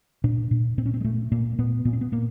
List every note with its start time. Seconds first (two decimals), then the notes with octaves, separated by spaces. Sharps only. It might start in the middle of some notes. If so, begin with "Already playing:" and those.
0.24 A#2 D4
0.51 A#2
0.78 A#2 C4
0.86 C#4
0.94 C4
1.01 G#3
1.04 A#2 A3
1.32 A#2 A#3
1.59 A#2 B3
1.85 A#2 B3
1.93 C4
2.01 B3
2.12 A#2 A#3